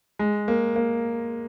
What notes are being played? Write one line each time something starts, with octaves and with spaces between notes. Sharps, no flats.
G#3
A#3
A#3